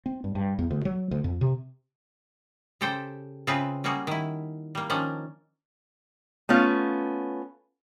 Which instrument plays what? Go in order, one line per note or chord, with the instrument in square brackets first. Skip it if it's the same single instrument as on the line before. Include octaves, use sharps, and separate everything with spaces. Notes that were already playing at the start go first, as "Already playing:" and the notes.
[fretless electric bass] C4
G2
G2
E2
D2
F#3
D2
F2
C3
[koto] C#3 G4 A4 C5 G5
C#3 C4 F4 G#4 B4 E5
G3 A#3 C#4 F#4 G#4
D#3 E4
G3 A#3
D#3 F3 C#4 D4
[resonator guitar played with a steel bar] A3 B3 C#4 F4